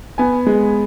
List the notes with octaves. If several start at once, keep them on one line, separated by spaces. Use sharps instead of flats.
B3 G#5
G#3